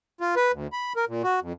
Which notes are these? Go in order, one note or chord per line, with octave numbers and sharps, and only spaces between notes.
F4
B4
D2
B5
A#4
A#2
F#4
F2